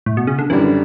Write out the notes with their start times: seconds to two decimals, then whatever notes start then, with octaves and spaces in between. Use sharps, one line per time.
0.06 A2
0.17 B2
0.27 C#3
0.39 D3
0.50 F#2 D3 E3 G3